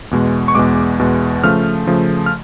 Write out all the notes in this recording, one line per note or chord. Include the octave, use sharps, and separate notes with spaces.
E2 B2 G#3
C#6
E2 B2 G#3 D6
E2 B2 G#3
C#3 F3 A3 F6
C#3 F3 A3
F6